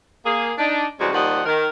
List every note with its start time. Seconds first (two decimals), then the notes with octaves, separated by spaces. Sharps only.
0.25 A#3 G#4
0.58 D4 D#4
0.99 C3 E3 G3 G#3 C#4 F#4
1.13 D#2 F3 G3 D#5 F#5
1.45 D#3 A#4